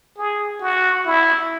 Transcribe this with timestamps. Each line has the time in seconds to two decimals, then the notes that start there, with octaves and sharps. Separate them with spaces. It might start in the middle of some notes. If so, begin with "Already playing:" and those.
0.17 G#4
0.61 F#4
1.06 E4